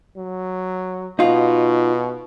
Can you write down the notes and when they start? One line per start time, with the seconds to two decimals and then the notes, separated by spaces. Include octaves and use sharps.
0.17 F#3
1.19 B2 D#4 F4 F#4